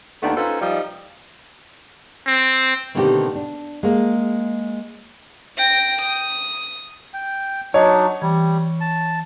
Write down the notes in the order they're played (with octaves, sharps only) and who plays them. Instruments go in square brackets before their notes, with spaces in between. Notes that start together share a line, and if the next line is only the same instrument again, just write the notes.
[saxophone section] D#2 D#3 A3 B3 D4 F4
C#4 D#4 F4 A4 B4 C5
F3 G3 D#4
[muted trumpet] C4
[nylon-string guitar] B2 D3 D#3 A3 C4 G4
D4
G#3 A#3
[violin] G5 A#6
D#6
[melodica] G5
[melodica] F#3 D4 D#4 [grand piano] C#5 [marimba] D#5
[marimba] E3 [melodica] G3
[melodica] A5